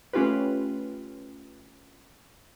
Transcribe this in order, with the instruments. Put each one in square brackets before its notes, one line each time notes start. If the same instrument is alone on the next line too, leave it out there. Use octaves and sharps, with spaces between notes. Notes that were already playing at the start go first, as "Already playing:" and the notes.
[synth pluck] A3 C#4 F4 G4 B4